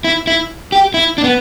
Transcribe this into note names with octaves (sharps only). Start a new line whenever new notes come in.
E4
E4
G4
E4
D4
B3